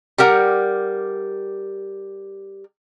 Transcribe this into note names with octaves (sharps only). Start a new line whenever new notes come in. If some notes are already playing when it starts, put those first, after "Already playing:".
G3 G4 A#4 F#5